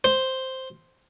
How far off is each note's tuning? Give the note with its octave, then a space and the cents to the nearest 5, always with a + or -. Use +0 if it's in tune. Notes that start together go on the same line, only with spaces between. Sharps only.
C5 +0